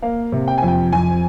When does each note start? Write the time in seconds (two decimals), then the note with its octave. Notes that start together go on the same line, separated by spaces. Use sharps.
0.02 A#3 F5
0.32 C3
0.48 G5
0.58 F2 G#5
0.68 G5
0.93 F2 G#5